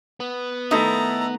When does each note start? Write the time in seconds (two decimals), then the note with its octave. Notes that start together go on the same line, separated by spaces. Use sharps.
0.20 B3
0.71 D#3 A3 D#4 E4 A4 A#5